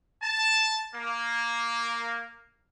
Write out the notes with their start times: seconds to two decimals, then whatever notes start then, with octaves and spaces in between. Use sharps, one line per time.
0.23 A5
0.95 A#3